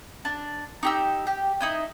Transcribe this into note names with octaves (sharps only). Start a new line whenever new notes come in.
D4
D#4 G4 E6
G4
D#4 E4 D#5